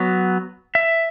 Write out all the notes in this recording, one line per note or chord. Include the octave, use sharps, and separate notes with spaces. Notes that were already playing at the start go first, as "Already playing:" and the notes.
Already playing: F#3 B3
E5